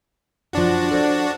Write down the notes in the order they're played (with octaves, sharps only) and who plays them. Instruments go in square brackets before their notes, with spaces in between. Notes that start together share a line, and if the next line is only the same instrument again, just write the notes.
[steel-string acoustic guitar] F#2 F3 [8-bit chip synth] D4 F#4
[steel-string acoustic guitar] A4 C5 D5